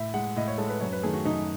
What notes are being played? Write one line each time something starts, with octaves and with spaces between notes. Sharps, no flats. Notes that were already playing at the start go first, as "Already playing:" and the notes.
Already playing: A2 E5
G#3 F#5
A2 D#5
C#5
G#3 A4
B4
F#2 C#5
B4
D#3 A3 G#4
F#4
F#2 D#4